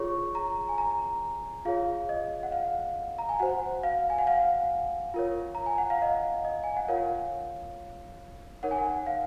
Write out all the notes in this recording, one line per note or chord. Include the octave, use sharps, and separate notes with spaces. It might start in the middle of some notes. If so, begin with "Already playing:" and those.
Already playing: F4 G#4 C#5 C#6
A#5
G#5
A#5
F4 G#4 C#5 F5
D#5
F#5
F5
A#5
G#5
F#4 C5 F#5
F5
G#5
F#5
F5
F4 A#4 C#5
A#5
G#5
F#5
F5
D#5
D#5
G#5
F#5
F4 A#4 C#5 F5
D#4 A#4 C#5 F#5
G#5
F#5
F5